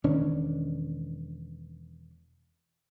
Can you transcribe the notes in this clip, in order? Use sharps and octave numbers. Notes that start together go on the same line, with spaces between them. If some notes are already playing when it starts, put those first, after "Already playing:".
E1 D#3 C#4 D4